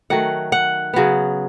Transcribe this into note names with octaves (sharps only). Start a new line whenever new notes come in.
D#3 F#3 A3 F#5
F#5
C#3 F#3 B3